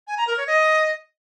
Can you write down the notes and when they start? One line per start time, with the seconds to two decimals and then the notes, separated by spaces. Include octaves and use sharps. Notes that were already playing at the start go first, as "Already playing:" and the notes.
0.08 G#5
0.17 A#5
0.27 A#4
0.37 C#5
0.47 D#5